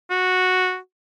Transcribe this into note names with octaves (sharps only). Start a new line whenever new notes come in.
F#4